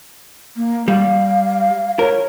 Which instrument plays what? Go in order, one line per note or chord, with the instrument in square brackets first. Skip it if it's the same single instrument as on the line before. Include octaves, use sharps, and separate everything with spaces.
[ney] A#3
[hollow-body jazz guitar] G3 [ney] F5
[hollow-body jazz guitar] A#4 [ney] C#5